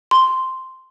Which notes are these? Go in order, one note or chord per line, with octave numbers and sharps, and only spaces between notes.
C6